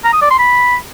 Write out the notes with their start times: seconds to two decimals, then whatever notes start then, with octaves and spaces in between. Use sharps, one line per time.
0.05 A#5
0.13 D#6
0.22 D5
0.30 C6
0.39 B5